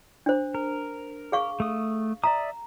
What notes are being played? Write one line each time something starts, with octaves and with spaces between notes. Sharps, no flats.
D4 C5
A#4
G#4 F5 C#6
A3 D#6
D5 E5 A#5 D#6